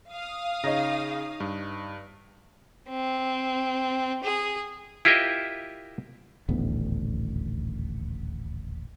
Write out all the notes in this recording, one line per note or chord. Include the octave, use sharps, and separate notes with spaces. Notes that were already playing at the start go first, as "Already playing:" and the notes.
F5 D#6
C#3 D#4 C#5 D#5 A#6
G2
C4
G#4
E4 F4 G4 A#4 D#5 E5
D#1 A1 D2 B3